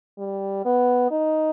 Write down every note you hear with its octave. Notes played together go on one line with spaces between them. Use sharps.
G3
B3
D#4